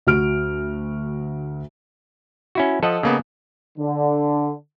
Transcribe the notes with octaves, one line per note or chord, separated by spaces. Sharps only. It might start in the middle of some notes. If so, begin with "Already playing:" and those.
D2 F#4 F6 D7
C#4 E4 F#4
F3 A4 D#5 F#5
C#3 A#3 B3
D3